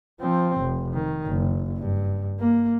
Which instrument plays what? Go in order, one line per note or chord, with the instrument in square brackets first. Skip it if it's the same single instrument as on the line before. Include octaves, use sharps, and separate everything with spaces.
[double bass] F3 C4
F1
D#3
F#1
G2
A#3